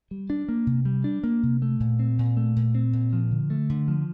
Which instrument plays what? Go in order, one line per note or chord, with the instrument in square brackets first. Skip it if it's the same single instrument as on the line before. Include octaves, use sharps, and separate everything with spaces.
[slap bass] G3
D4
A#3
C3
G3
D4
A#3
C3
A3
A#2
C4
A#2
A3
A#2
C4
A#2
F3
D3
A3
D3
F3